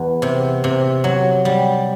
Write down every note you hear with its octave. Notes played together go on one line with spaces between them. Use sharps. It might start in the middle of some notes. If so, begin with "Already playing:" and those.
Already playing: E2
C3
C3
F#3
G3